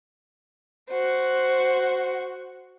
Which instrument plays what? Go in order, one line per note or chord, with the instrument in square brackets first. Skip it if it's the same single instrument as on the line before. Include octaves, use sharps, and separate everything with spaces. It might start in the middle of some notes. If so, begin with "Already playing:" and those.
[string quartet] F#4 C5